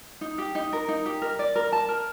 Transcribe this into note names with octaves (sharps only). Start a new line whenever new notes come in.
D#4
G4
D#4
A#4
D#4
G4
A#4
D5
A#4
A5
A#4